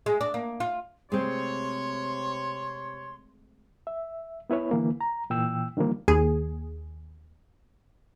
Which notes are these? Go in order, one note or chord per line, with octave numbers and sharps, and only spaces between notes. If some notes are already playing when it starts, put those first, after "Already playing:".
G#3
D4
A#3
F4
C3 G#3 A3 C4 C#5 C6
E5
B3 E4 B4 C#5
D3 E3 A#3
A#5
A#2 E3 G5 E6
D3 D#3 F3 G3 A#3
D#2 G#4